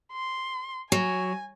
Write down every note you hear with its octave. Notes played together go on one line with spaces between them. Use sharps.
C6
F#3 G#5